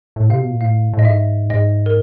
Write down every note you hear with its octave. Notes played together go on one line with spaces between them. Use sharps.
A2
C3 F5
B2
A#2
A2 F5
A2
D#5
G#2 E5
G#2 D#5
A#4